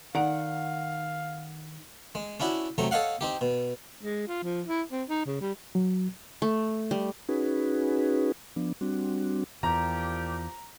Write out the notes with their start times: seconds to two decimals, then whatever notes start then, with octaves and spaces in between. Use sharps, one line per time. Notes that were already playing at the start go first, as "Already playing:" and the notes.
0.15 D#3 D#4 D5 F5 F#5 A#5
2.15 G#3
2.40 C#4 D4 E4 F#4
2.78 C3 F#3 A3 A#5
2.91 A4 C#5 D#5 F5 F#5
3.21 C4 D#4 G4
3.41 B2
4.03 G#3
4.28 F4
4.43 F3
4.67 E4
4.91 C4
5.09 D#4
5.25 C#3
5.41 G3
5.75 F#3
6.42 A3
6.91 G3
7.29 C#4 D#4 F#4 G#4 B4
8.56 F3 B3 D4
8.81 G3 C4 D4 F#4
9.63 E2 A#2 F3 G4 A#5